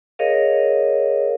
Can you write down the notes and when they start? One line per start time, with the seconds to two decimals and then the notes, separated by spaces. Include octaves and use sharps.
0.19 G#4 A#4 C#5 D#5 F5